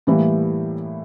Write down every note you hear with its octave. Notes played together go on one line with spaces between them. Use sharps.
A2 E3 G3 A#3